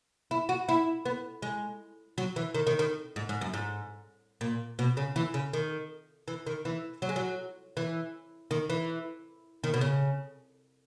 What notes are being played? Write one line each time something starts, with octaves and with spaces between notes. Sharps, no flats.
E4
F#4
E4
B3
G#3
F#3
E3
D#3
D#3
D#3
G#2
G#2
F#2
G#2
A#2
B2
C#3
E3
C#3
D#3
E3
D#3
E3
F#3
G#3
F#3
E3
D#3
E3
D#3
B2
C#3